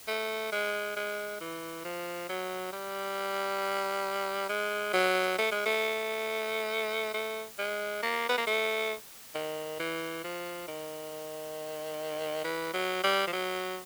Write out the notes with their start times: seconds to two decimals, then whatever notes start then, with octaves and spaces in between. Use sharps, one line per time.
0.07 A3
0.52 G#3
0.96 G#3
1.41 E3
1.85 F3
2.29 F#3
2.73 G3
4.49 G#3
4.93 F#3
5.38 A3
5.52 G#3
5.66 A3
7.14 A3
7.59 G#3
8.03 A#3
8.29 B3
8.38 A#3
8.47 A3
9.35 D#3
9.80 E3
10.24 F3
10.68 D#3
12.44 E3
12.74 F#3
13.04 G3
13.27 F3
13.33 F#3